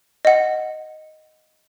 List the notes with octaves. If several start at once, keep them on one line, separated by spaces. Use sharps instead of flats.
D#5 F#5